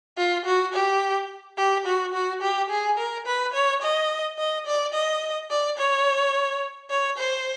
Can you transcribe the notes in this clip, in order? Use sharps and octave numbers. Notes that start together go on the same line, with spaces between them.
F4
F#4
G4
G4
F#4
F#4
G4
G#4
A#4
B4
C#5
D#5
D#5
D5
D#5
D5
C#5
C#5
C5